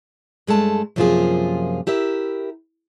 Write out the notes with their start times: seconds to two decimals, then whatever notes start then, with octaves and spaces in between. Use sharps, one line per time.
0.47 G2 G#3 A3 A5
0.96 F#2 C3 F3 A#3 F4 G#4
1.87 E4 G4 A#4 E5